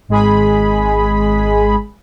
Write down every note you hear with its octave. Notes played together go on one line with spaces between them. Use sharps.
G#1 G#3 G#4 B5